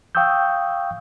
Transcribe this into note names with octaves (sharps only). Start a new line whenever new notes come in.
F5 G5 C#6 D#6 E6 G6